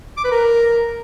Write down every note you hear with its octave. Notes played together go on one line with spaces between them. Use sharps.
D6
B4
A#4